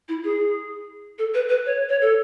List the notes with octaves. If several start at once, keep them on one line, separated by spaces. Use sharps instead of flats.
E4
G#4
A4
B4
B4
C#5
C#5
A4